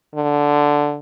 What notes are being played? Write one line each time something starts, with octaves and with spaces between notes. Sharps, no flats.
D3